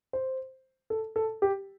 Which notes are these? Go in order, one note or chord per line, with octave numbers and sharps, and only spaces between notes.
C5
A4
A4
G4